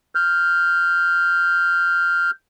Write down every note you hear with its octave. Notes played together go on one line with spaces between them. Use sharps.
F6 G6